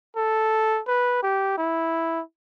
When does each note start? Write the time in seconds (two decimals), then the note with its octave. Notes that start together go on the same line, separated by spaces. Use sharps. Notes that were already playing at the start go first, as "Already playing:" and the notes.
0.17 A4
0.87 B4
1.23 G4
1.57 E4